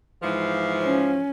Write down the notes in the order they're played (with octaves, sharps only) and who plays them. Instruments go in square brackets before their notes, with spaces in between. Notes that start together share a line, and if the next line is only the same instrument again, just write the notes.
[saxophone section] G#2 E3 F3
[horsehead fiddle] C#4